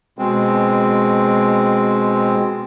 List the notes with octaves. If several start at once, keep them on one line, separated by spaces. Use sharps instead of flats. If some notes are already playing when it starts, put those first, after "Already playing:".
B2 G#3 C4